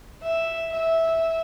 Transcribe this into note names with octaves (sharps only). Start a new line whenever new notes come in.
E5
E5